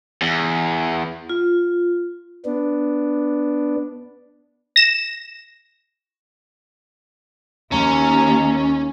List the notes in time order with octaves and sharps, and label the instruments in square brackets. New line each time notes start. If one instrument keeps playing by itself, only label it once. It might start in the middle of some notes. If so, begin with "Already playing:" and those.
[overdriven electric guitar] E2
[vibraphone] F4
[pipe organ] B3 D4
[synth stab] A#6 E7
[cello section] D#2 [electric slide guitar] C#4 [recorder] A#5